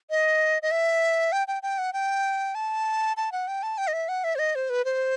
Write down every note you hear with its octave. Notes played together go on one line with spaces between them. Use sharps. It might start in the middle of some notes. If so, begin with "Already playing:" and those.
D#5
D#5
E5
G5
G5
G5
F#5
G5
A5
A5
F#5
G5
A5
G5
D#5
E5
F#5
E5
C5
D#5
C5
B4
C5